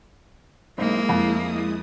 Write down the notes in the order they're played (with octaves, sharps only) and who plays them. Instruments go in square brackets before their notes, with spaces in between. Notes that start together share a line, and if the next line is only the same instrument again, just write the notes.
[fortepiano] B1 C4 D#4 [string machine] G#3 E4 D#6 [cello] A#3
[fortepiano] F2